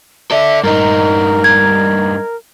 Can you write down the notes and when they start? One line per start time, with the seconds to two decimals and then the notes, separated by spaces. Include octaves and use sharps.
0.31 A4 D5 E5
0.64 G2 D#4 A#4
1.44 G#6